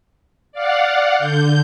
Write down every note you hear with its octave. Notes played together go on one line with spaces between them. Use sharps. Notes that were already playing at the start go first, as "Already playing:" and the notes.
D5 F5 F#5
D3 G6